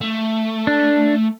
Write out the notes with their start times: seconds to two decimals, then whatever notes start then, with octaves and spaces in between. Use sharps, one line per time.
0.01 A3
0.67 D4